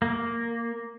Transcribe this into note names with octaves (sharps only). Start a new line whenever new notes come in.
A#3